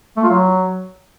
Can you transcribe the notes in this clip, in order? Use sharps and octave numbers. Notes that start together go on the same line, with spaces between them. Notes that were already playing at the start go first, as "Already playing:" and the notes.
A3
F4
F#3